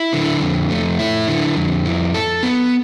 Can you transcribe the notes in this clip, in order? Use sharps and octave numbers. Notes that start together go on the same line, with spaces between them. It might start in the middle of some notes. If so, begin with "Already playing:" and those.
Already playing: E4
D3
F2
A3
E4
D3
F2
E4
A4
B3